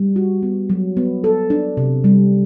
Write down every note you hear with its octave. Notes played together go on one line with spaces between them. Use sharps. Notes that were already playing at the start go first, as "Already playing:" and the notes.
Already playing: G3
F#4
B3
F#3
B3
A4
D4
C3
G3